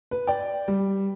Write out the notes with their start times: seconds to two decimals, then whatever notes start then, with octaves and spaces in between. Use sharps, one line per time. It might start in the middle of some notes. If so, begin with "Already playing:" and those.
0.11 B4
0.27 D5 G5
0.68 G3